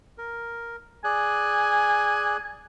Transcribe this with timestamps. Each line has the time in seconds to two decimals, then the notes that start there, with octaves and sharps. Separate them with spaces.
0.18 A#4
1.04 G#4 D5 G#5 F#6